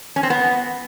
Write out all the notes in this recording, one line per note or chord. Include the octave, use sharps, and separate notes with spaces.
C#4
C4
B3